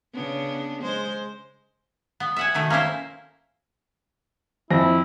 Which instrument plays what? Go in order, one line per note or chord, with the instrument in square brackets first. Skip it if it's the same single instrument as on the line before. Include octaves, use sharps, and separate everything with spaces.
[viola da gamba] C#3 B3 D4
G#3 C5
[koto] B3
E5 F#5 G#5
B2 D#3 A3
A#3 C#4 E4 C5
[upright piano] F2 C4 A#6 [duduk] E4